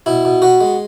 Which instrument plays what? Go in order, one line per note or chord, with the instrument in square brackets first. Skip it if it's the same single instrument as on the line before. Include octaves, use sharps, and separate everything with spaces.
[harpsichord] B2 E4
B2
B3 F#4
G#3